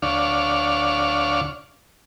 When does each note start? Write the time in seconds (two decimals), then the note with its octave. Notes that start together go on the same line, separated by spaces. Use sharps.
0.02 D2 D4 C#5 F5